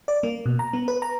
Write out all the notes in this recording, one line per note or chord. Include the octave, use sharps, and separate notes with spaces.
D5
A#3
B2
A#5
B3
B4
A#5